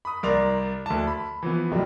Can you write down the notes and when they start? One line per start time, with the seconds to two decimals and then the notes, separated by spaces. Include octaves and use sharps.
0.05 B5 D#6
0.23 C2 A#4 D5 C6 F7
0.86 D2 A5
1.07 B5
1.43 E3 F3 B3
1.72 F1 G2 F#3 G3